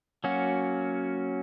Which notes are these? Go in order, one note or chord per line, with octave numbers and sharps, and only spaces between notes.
F#3 A#3 C#4 F#4